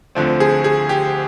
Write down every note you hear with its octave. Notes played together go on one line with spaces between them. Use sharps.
D2 D3 F3 C4
G#4
G#4
G4